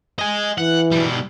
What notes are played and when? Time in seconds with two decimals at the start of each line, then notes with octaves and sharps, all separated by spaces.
0.19 D#5 G#5
0.58 E3 F#5
0.92 B2 G3